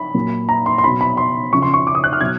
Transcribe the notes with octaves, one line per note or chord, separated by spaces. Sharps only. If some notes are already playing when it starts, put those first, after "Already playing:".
Already playing: B5
A#2 F#3
A#5
C6
C6
B2 F#3 B5
B5
C6
C#3 F3 C#6
C6
C#6
D6
D#6
F#6
F6
B2 F#3 G#6